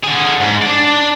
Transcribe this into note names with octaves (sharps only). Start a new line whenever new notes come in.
D3 G#4
G#2
D4 D5